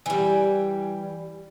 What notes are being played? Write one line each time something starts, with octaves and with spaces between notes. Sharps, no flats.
E3 G3